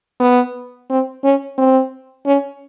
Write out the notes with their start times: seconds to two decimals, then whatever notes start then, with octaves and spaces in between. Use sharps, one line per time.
0.20 B3
0.90 C4
1.24 C#4
1.58 C4
2.26 C#4